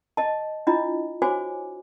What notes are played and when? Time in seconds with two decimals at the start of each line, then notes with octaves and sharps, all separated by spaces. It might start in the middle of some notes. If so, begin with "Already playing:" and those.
0.17 D#5 A5
0.67 D4 E4 F4 D#5
1.22 F#4 C5 C#5 G#5 D6